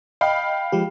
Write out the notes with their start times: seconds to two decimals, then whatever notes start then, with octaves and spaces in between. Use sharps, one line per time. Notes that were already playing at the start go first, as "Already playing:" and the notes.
0.21 D#5 F5 G5 B5
0.72 F3 G#3 G4